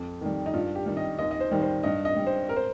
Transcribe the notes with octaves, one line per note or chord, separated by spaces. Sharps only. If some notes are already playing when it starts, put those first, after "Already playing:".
Already playing: F2
D#3 G3
D#4
G2 F4
G4
D#3 G3
D#5
D#2 D#5
D#5
C5
D#3 G3
C5
G2 D#5
D#5
G3
C5
A#4
C5